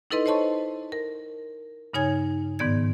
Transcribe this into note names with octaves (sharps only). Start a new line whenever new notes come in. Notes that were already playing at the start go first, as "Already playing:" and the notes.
D#4 E4 A4 B4 D#5 C6
C5 C#5 D#5 A5 C6 C#6
A#4
G2 C#3 D#4 C#5 G#5 G#6
G#2 D#3 B3 D5 G#6